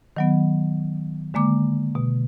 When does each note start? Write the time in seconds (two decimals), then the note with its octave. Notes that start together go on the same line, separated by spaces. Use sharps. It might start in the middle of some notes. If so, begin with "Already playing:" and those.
0.17 D#3 F#3 B3
1.34 D3 G#3 A#3 D6
1.95 B2